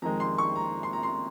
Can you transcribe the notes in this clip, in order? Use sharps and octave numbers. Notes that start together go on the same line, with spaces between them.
F2 D#3 G#3 A#5
C6
C#6
A#5
C6
A#5
C6